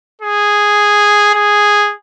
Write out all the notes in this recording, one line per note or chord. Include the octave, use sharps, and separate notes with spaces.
G#4
G#4